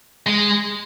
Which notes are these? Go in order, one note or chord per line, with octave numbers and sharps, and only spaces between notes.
G#3